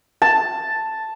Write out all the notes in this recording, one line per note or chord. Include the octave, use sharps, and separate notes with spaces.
A5